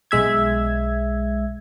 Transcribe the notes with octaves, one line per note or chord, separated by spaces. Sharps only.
B1 G#3 E5 G#6